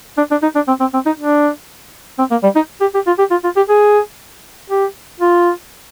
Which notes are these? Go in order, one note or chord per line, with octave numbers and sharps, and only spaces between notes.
D4
D4
D#4
D4
C4
C4
C4
D#4
D4
C4
A#3
G3
D#4
G4
G4
F4
G4
F4
F4
G4
G#4
G4
F4